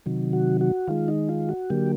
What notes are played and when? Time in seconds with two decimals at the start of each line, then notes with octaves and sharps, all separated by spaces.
0.06 C3 D#3 F#3
0.33 F#4
0.61 F#4
0.88 D#3 G#3 F4
1.08 D#4
1.29 F4
1.49 F#4
1.70 D3 F#3 A#3 G4